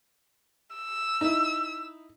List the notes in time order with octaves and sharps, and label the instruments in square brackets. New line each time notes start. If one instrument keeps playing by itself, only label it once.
[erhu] E6
[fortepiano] D#4 E4